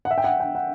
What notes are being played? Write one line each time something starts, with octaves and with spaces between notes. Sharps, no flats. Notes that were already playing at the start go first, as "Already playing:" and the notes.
F#5
E5
G5
F#5
G5
F#5